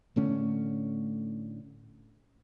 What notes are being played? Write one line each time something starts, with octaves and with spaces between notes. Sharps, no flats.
A2 D3 A3 C#4